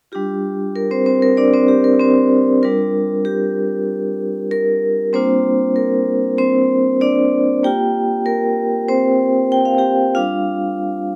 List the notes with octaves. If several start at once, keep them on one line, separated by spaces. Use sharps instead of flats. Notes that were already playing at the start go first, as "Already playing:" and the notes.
G3 D4 F4 G4
A#4
C4 C5
C4 C5
A#4
D4 D5
C4 C5
G4
A#4
C4 C5
G3 D4 F4 A#4
G4
A#4
G3 A#3 C4 D4 F4 C5
A#4
C4 C5
D4 D5
A#3 F4 G4 G5
A#4
C4 C5
G5
F5
G4 G5
G3 D4 F4 F5